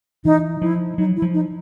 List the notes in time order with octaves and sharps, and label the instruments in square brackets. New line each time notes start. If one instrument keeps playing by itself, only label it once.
[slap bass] E3 [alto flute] D#4
[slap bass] F3 [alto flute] E4
[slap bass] F#3 [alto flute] D#4
[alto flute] E4
[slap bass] F3
[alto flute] D#4